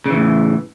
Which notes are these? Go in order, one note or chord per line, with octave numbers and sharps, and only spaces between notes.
A2 C#3 E3